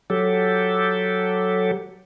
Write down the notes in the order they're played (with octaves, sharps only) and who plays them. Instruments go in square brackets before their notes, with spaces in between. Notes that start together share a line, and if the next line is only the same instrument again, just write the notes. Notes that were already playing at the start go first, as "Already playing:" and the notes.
[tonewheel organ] F#3 G4 A4